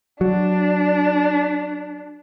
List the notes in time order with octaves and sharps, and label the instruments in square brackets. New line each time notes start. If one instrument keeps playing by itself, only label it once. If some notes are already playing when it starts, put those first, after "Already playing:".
[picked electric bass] F#3 [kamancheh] D4